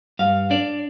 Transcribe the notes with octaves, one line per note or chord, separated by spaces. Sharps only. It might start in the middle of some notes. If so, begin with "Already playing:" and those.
G2 F5
D4 D5